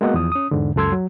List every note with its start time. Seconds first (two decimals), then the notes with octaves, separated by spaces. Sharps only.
0.01 G#3 A#3 B3 F#4 D#5 F#5
0.14 E2 F3 D#6
0.32 C#4 D#6
0.51 E2 G#2 D3
0.76 C#2 F#2 A4 C6 E6 G#6
0.92 F#3